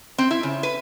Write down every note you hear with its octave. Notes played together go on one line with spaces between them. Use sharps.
C4
E4
C#3
B4